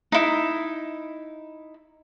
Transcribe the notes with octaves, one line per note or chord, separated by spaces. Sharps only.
D#4 E4